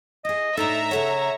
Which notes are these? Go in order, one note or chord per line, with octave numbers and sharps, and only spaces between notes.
E4 G#4 D#5
A2 D4 D#4 A4 E5 A#5
C#3 A4 C#5 F#5